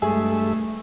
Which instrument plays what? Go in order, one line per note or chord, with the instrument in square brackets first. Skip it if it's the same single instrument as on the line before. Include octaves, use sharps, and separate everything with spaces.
[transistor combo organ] G2 A4 E5 [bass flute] G#3 [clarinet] A3 [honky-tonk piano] G#4